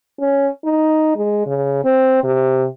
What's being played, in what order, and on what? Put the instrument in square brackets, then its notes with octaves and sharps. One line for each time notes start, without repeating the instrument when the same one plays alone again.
[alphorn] C#4
D#4
G#3
C#3
C4
C3